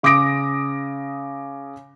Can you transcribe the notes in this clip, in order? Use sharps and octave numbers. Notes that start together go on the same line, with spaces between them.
C#3 D6 D#6 A#6 D7